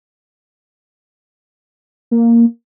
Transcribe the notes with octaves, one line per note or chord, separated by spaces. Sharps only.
A#3